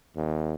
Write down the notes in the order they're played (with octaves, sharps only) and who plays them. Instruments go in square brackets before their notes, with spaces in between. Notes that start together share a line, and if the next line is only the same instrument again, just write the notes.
[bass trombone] D#2